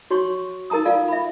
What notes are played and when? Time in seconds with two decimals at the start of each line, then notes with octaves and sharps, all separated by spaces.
0.10 F#4 C#5 C6 C#6
0.70 D#4 A#4 A5 A#5 D#6
0.85 F4 A4 D5 F5
1.08 E5 B5